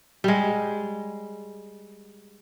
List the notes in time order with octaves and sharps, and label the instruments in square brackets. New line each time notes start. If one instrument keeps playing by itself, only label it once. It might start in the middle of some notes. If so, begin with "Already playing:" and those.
[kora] G3 G#3